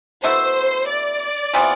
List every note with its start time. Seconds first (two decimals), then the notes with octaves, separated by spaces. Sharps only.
0.23 B2 A3 E4 C5
0.88 D5
1.54 C3 E3 B3 F4